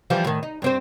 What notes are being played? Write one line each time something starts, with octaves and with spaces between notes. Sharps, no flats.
E3 F3 G3
A2 D#3
D#4
G2 C4 C5